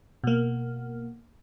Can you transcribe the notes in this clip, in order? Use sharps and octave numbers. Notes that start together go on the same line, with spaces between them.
B2 A#3